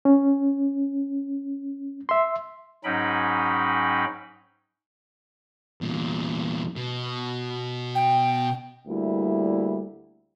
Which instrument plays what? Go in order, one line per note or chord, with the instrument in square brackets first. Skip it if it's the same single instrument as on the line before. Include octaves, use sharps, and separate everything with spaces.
[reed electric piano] C#4
E5 C6
[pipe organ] G#2 F#3 C#4 D#4 G5 B5
[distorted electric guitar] E2 A#2
B2
[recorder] G5
[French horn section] D2 G3 A#3 E4